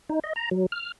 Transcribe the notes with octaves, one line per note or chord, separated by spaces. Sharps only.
D#4
D#5
A#5
F#3
F6